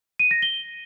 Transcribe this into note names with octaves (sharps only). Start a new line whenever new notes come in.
D#7
A#6
G7